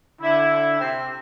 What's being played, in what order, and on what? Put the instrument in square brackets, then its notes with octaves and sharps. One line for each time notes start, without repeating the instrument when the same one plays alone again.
[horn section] D3 E4
C3 C4